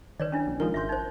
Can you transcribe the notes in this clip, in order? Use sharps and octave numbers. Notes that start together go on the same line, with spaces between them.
D#3 B4 C#5 D5
C#4 D4 E4
B1
D#3 F3 G#3 A#4
G#1 E5 C6 G6
D#4 C5